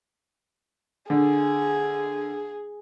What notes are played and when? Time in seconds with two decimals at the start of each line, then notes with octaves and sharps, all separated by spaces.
1.10 D3 G#4